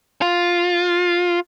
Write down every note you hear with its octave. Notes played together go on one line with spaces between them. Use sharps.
F4